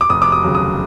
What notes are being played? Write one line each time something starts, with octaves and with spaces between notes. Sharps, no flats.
D6
F1 D#6
D6
D#6
D#2 C#3 F#3
D#6